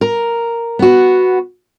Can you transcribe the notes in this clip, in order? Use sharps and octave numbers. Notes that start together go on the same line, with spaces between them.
A#4
B3 F#4